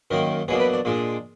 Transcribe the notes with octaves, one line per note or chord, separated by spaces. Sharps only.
F#2 D#3 A#3 D#4 A#4
B2 F#3 A#3 D4 G#4
B4
D5
A#2 G#3 D4